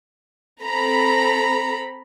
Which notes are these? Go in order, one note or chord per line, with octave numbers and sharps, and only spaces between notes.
C4 A4 A#5 B5